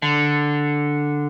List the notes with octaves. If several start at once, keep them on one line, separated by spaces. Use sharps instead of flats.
D3